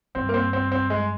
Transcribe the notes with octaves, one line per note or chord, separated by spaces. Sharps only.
G2 C4
A#3
C4
C4
C4
G#3